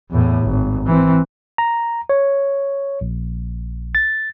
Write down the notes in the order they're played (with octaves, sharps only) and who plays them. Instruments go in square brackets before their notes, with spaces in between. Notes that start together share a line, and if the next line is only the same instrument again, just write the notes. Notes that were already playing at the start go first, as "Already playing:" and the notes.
[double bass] E2 A2
G#1
E3 C4
[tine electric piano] A#5
C#5
A#1
A6